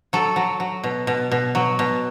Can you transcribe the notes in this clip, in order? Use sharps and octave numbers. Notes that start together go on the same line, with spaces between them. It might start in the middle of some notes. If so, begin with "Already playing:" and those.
F#3 A4
F#3
F#3
B2
B2
B2
F#3
B2